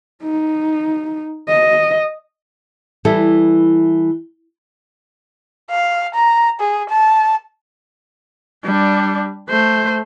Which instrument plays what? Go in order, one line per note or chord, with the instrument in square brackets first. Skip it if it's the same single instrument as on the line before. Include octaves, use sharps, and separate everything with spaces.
[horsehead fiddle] D#4
D#5
[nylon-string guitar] E3 G3 E4 A4
[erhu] F5
A#5
G#4
A5
[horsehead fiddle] G3 D4
A3 C5